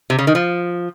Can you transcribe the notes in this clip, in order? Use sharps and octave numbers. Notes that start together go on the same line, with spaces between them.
C3
C#3
D#3
F3